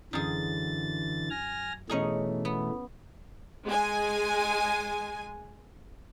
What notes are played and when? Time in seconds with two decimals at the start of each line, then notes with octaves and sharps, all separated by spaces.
0.13 F#2 D3 E3 G#4 A6
1.30 G#5 F6 A#6
1.89 B2 E3 A3 C#4 D#4 G#4
2.45 B3
3.65 G#3 G#5